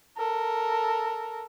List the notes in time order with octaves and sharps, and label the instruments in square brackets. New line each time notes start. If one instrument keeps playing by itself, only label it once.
[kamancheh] A4 A#4